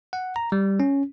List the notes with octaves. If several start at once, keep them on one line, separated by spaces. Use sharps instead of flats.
F#5
A#5
G3
C#4